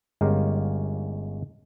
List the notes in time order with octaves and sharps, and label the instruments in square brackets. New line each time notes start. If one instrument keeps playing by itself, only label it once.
[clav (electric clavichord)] G1 G#3 C#4 G4 A#4 F5